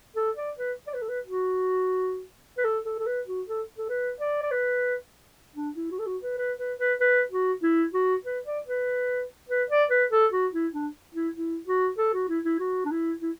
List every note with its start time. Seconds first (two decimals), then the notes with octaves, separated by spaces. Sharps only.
0.16 A4
0.37 D5
0.58 B4
0.87 D5
0.94 B4
1.02 A4
1.09 B4
1.25 F#4
2.58 B4
2.64 A4
2.85 A4
2.99 A4
3.06 B4
3.27 F#4
3.48 A4
3.78 A4
3.89 B4
4.20 D5
4.43 D5
4.52 B4
5.56 D4
5.76 E4
5.91 F#4
5.99 A4
6.06 F#4
6.23 B4
6.38 B4
6.59 B4
6.79 B4
7.00 B4
7.31 F#4
7.63 E4
7.93 F#4
8.25 B4
8.45 D5
8.66 B4
9.49 B4
9.70 D5
9.90 B4
10.12 A4
10.32 F#4
10.53 E4
10.73 D4
11.15 E4
11.36 E4
11.67 F#4
11.98 A4
12.14 F#4
12.29 E4
12.44 E4
12.59 F#4
12.85 D4
12.91 E4
13.22 E4